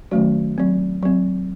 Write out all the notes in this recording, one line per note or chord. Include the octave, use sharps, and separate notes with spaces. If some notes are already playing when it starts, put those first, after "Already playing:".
D#3 F#3 A3 C#4 F#4
F#3 C4
F#3 C4